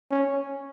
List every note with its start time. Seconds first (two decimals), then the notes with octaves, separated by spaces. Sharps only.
0.11 C#4